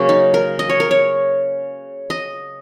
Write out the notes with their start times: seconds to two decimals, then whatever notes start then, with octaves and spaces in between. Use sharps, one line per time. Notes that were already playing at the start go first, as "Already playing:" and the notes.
Already playing: C#3 F#3 A#3 C#4
0.09 D#4
0.34 A#4
0.59 D#5
0.69 C#5
0.80 A#4
0.91 C#5
2.10 D#5